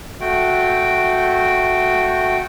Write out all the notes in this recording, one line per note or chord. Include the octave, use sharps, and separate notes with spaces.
A3 F#4 G5